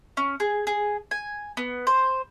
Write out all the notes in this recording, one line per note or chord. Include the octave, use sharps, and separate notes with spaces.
C#4
G#4
G#4
G#5
B3
C5